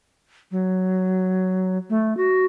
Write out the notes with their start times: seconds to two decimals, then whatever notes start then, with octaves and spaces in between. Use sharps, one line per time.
0.51 F#3
1.90 A3
2.17 F#4